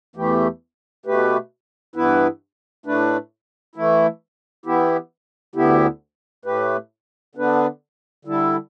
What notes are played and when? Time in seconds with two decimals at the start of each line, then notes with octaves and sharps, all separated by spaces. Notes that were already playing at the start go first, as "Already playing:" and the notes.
0.16 E2 E3 A3 G4
1.06 B2 A3 G4 B4
1.96 G2 E3 B3 E4 B4
2.86 A2 A3 D4 B4
3.75 E3 A3 E4
4.66 E3 B3 E4 G4
5.55 D2 D3 B3 E4 G4
6.45 A2 A3 G4 B4
7.35 D3 B3 D4 B4
8.25 D3 G3 E4 A4